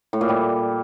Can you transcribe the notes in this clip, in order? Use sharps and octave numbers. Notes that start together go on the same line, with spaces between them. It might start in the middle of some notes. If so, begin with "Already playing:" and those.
A2
A#2
G3